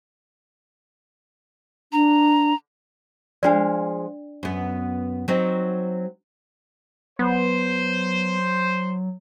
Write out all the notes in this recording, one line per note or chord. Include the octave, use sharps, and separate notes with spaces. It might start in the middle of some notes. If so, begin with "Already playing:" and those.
D4 A#5
F3 G#3 D4 D5 F5
F#2 B3
F#3 C4 D#4
F#3 B3 C5